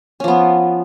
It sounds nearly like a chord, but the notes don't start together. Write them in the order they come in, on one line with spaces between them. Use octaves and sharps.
C#4 F3 B3